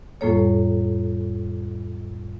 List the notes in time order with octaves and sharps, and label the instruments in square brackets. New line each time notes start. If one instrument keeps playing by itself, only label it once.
[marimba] F2 A2 G3 A#3 A4 C#5